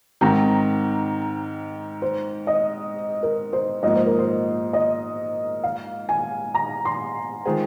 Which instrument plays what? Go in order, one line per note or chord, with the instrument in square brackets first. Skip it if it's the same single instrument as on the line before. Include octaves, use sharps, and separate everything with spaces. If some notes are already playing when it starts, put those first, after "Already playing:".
[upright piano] G#2 D#3 C4 [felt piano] A#5
[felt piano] C5
D#5
A#4
C5
[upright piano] G#2 F3 A#3 [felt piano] D#5
[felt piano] C5
A#4
C5
D#5
F5
G#5
A#5
C6
[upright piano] D#3 G#3 F4 G#4 [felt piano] C5